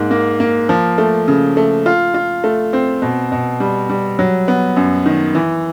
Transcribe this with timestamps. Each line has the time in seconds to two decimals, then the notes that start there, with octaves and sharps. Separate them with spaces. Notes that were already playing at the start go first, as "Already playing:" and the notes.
Already playing: G#2 A#3
0.11 A#3
0.40 A#3
0.69 F3
0.98 A3
1.28 C#3
1.57 A3
1.86 F4
2.14 F4
2.44 A3
2.73 C4
3.02 B2
3.32 B2
3.60 G3
3.89 G3
4.19 F#3
4.48 B3
4.76 F#2
5.06 D#3
5.35 E3